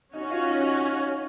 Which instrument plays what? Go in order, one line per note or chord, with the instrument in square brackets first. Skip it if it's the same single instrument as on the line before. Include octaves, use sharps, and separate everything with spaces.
[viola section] C#4 F#4 C#5 [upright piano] D#4
[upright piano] F4
D#4